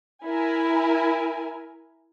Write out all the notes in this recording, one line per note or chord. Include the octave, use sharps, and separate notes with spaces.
E4 A#4 G#5